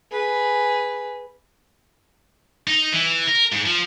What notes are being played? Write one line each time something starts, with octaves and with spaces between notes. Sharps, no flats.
G#4 B4
D#4
E3
A#4
G#2
F3